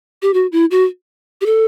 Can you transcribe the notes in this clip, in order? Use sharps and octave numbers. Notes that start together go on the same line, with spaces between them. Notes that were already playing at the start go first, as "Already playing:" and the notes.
G4
F#4
E4
F#4
G4
A4